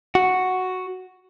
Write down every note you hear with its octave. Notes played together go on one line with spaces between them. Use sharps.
F#4